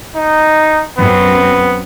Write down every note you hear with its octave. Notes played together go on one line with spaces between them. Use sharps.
D#4
F#2 B3 C4